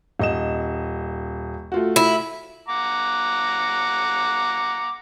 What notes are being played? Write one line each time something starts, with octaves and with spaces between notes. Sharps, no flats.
D#1 D#5 E7
A3 F4 F#4
E4
F#5 A#5 D6